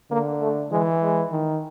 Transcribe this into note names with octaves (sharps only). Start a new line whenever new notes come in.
D3 A#3
A3
E3 G#3
G#3
D#3